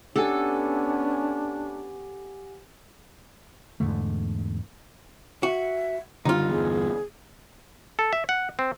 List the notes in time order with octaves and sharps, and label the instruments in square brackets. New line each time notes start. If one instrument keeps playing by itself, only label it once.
[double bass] B3 C#4 [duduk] D4 [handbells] G4 F#5 G#5 [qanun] A4
[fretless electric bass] E2 G#2 D3 A3
[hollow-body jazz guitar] F#4 [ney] E5
[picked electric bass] F#1 D3 G3 [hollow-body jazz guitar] D#4 F4 [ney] C6
[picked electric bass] G1 E2 [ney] G#4
[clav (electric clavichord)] A4
E5
F#5
C4